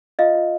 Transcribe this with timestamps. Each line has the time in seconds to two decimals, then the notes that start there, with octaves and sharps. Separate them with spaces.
0.19 F4 D#5 F5
0.35 F4